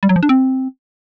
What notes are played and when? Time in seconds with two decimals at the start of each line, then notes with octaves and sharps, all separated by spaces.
0.03 G3
0.09 F#3
0.16 F3
0.23 D4
0.29 C4